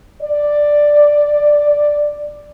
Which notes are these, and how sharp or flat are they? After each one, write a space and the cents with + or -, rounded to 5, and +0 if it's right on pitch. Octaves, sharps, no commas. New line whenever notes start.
D5 +5